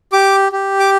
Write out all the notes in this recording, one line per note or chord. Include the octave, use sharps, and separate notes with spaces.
G4 D6
G4
D6